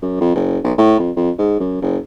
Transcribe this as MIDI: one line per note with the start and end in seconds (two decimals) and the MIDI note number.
0.02 0.17 42
0.21 0.32 41
0.35 0.58 30
0.64 0.73 35
0.78 0.95 45
0.99 1.11 41
1.16 1.30 41
1.38 1.57 44
1.60 1.80 42
1.82 1.98 30